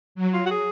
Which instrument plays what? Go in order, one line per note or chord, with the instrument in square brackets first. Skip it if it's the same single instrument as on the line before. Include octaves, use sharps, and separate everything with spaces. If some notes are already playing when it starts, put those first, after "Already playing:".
[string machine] F#3
[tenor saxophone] F4
F#4
G#4